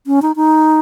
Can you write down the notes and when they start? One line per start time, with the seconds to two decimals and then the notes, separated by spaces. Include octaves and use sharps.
0.07 C#4
0.22 D#4
0.36 D#4